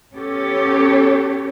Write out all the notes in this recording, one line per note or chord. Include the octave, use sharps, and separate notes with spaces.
B3 C#4 G4 A4 C#5